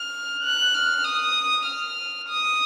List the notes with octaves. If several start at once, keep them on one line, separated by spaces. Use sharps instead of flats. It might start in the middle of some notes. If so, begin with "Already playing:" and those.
Already playing: F6
F#6
F6
D#6
F6
D#6